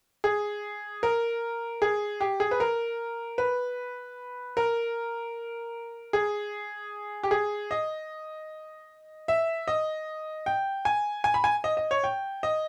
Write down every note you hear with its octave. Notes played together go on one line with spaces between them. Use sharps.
G#4
A#4
G#4
G4
G#4
B4
A#4
B4
A#4
G#4
G4
G#4
D#5
E5
D#5
G5
G#5
G#5
B5
G#5
D#5
D#5
C#5
G5
D#5